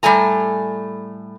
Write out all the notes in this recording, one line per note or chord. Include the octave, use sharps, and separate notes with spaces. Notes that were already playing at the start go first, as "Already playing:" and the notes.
A2 G3 A3 G#5 A#5